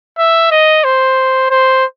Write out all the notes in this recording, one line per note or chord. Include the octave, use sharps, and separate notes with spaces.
E5
D#5
C5
C5